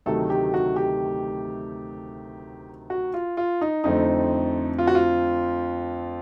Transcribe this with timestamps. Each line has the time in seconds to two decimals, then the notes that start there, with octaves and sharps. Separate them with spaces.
0.06 D2 C3 D#3 F#3 A3 A4
0.30 G4
0.54 F#4
0.76 G4
2.90 F#4
3.14 F4
3.37 F4
3.61 D#4
3.84 F2 D3 F3 A3 C4 D#4
4.79 F4
4.87 F#4
4.95 F4